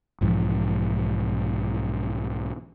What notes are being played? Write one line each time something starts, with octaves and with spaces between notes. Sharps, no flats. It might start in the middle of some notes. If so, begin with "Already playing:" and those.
B1 G#2 E3 F3